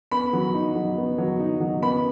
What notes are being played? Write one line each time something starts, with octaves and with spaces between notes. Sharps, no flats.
B3 B5
F#3
D#4
F#3
B3
F#3
D#4
F#3
B3 B5